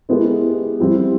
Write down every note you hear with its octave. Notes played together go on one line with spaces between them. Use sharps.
G#3 B3 E4 G4 A#4
G3 C4 E4 G4